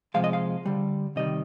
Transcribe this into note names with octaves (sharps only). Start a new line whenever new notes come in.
C3 F3 G#3 F5
D#5
F5
D3 G3
C3 D#3 G3 D#5